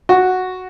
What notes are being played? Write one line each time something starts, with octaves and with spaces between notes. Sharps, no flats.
F#4